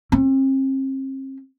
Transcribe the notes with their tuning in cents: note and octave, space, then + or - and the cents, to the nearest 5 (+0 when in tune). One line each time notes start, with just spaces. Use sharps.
C4 +40